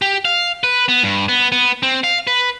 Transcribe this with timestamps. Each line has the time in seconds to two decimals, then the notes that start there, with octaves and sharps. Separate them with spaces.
0.02 G4
0.25 F5
0.64 B4
0.89 B3
1.03 G2
1.29 B3
1.52 B3
1.83 C4
2.04 F5
2.27 B4